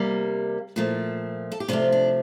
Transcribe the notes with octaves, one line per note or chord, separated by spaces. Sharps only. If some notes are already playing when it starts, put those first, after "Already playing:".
Already playing: C3 G3 A#3
A#2 F3 A3
A4
G4
C3 F3 A3 D4 F4
D4